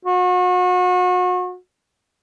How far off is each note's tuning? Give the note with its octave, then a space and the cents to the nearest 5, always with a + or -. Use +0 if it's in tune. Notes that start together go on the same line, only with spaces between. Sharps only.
F#4 -35